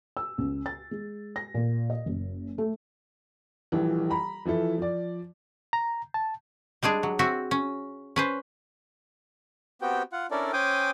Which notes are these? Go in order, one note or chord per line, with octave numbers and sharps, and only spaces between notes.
E6
C#2
A6
G#3
A#6
A#2
D#5
F#1
A3
D#1 A#1 E3
A#5 B5
E3 F3 E4 A4
F3 D5
A#5
A5
G3 G#3 D4 G#4
F#3
C4 F#4 E5
C#4
C#4 B4 C5
B3 C4 F#4 G4 G5
F4 F#5
C#4 D4 E4 A4 A#4 D5
C#4 C5 G5 G#5 D6 D#6